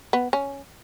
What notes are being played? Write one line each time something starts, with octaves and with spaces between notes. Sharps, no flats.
B3
C#4